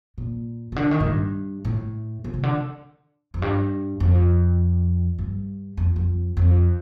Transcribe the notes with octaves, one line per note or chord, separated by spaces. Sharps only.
A#2
C3
D3
D#3
A2
G2
A2
A#2
C3
D3
F2
G2
F2
G2
F2
F2
F2